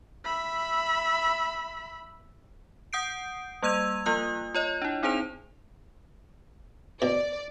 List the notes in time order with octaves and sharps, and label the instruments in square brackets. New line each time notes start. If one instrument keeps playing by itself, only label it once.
[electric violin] E5 B5
[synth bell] F#5 D#6 G6 C7 D7
G3 A#3 E6 G#6 D#7 F7
F3 A#3 F4 D#6 F#6
F4 C#5 D#5
D4 E4
C4 D#4 G#4 C5 A5 F7
[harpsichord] B2 [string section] D5